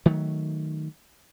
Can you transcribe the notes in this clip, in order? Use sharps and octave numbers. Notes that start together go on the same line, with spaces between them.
D#3 F#3 A3